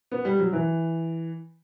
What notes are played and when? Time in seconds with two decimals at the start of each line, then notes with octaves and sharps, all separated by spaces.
0.12 B3
0.25 G3
0.39 F#3
0.53 E3